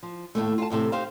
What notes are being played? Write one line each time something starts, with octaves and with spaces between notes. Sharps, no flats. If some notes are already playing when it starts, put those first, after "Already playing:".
F3
D#2 A2 C3 A3
F4 A5
E2 A2 C3 A4
D#4 G4 C5 F5